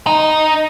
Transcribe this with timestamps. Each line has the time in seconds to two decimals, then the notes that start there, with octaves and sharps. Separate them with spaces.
0.07 D#4